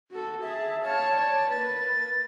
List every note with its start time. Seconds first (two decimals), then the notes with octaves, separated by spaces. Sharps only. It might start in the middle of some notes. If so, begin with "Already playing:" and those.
0.11 F#4 A4
0.42 G#4 E5 A5
0.83 C#5 F5 A5
1.14 C#5 D5
1.51 A#3 B4 A6